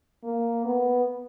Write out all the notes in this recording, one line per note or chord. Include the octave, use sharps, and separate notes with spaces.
A#3
B3